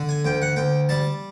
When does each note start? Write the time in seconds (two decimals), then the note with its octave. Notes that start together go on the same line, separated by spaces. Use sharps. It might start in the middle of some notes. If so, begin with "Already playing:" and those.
Already playing: D3
0.09 G#5
0.25 D2 G5
0.42 F#5
0.56 D2 G5
0.89 G3 A5